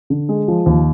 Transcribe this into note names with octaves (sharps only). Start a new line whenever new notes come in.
D3
G#3
F3
D#2